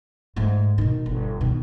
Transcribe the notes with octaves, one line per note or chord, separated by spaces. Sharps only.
G#2 A3
B2 D#3
G1
B2 D#3